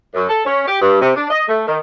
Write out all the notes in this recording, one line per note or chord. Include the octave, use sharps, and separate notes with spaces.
F#2
A4
C#4
G4
G2
C3
D4
D#5
A3
D#3